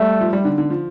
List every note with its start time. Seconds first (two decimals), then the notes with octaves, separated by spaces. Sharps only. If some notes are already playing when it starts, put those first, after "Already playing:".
Already playing: G3 A3
0.21 F3
0.33 G3
0.45 D3
0.58 D3
0.70 F3